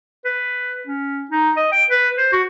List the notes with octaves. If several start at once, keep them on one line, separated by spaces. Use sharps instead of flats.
B4
C#4
D#4
D#5
G5
B4
C5
F#4